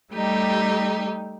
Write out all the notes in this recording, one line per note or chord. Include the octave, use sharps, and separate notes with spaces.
G3 A3 D#4 G4